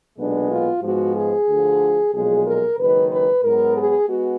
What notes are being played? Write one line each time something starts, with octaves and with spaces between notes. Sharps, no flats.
B1 A#2 G#3 B3 D4
F4
G#2 F3 G#3 B3 F#4
G#4
D2 D3 F3
B1 A#2 F3 G#3 G#4
A#4
F#1 F#2 D#3 G#3 B4
B4
G#2 F#3 B3 A#4
G#4
G#3 B3 F#4